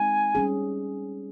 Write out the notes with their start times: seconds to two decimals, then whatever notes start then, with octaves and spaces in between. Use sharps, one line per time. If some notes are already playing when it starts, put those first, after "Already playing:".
Already playing: G#3 C4 D#4 G#5
0.35 G3 C#4 G#4